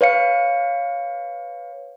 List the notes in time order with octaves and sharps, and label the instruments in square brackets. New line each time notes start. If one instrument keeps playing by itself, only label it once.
[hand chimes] B4 C#5 F5 C#7